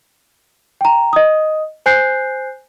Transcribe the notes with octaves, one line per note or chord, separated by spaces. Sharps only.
G5 A#5
D#5 D#6
C5 G#5 F#6 G6 C7